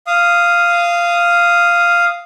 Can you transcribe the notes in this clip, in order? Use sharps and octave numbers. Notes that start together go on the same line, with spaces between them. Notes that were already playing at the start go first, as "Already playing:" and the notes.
F5 D#6